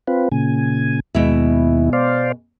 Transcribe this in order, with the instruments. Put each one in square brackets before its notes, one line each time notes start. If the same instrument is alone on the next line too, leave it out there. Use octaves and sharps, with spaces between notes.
[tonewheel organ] C4 F4 B4
A#2 C#3 G#5
[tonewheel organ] D#2 E4 [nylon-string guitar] B2 G#3 E5
[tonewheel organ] C5 D5 F5